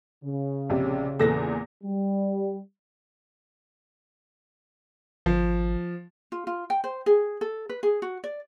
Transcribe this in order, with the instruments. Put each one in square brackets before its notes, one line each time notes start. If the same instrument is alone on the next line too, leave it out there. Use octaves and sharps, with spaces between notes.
[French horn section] C#3
[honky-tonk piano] A#1 C3
[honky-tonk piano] E2 A#2 A#6 [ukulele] A4 B4
[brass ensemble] G3
[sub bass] G#1 [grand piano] F3
[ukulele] F4
F4
G5
C5
G#4
A4
B4
G#4
F#4
D5